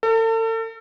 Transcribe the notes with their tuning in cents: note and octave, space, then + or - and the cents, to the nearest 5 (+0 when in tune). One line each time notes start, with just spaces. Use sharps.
A4 +40